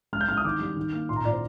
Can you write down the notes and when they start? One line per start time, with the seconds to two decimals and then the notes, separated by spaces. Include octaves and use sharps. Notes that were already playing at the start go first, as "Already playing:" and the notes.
0.13 G#3 F6
0.21 G6
0.28 G#3 F6
0.37 D#6
0.44 D#3 D6
0.61 G3
0.77 D#3
0.92 A#3
1.09 A#2 C6
1.16 A#5
1.25 A#2 D5
1.33 C5